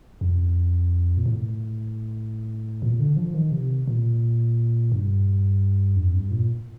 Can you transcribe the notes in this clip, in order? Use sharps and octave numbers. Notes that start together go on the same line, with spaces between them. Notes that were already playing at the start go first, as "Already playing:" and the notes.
F2
A#2
A2
A#2
D3
F3
D#3
C3
A#2
G2
F2
G2
A#2